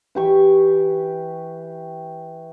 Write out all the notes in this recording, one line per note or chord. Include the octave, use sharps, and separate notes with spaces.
E3 G4 C#6